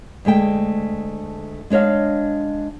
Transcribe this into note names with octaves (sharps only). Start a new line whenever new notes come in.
D2 G#3 A3 G5
G#3 D4 C#5 D#5 F5